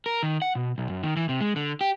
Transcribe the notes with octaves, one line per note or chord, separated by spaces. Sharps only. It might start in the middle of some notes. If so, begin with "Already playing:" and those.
A#4
D#3
F#5
B2
B1
F#2
D#3
E3
C3
G#3
D3
G4